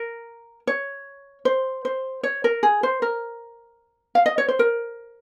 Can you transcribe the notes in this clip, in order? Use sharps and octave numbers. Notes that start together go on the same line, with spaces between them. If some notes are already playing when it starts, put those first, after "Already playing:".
Already playing: A#4
C#5
C5
C5
C#5
A#4
G#4
C5
A#4
F5
D#5
C#5
C5
A#4